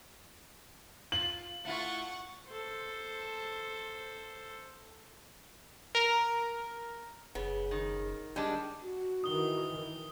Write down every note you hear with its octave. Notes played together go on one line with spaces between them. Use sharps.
F4 F#7
A3 E4 F4 F#5 C#6
A4 C5
A#4
F#1 C#3 B3
D#3
D#3 G3 G#3 D4
F#4
D#3 E3 D#6 G7